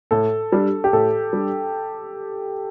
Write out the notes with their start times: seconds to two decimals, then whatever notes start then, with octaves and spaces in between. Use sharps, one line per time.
0.11 A2 A4
0.52 G3 D4
0.84 G4
0.93 A2 A4
1.33 G3 D4